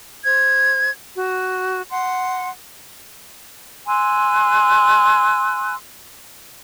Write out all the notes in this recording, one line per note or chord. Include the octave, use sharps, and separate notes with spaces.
C5 G#6
F#4
F#5 C6
G#5 C6 E6 F#6